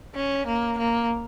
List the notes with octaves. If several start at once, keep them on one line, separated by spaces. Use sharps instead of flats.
C#4
A#3
A#3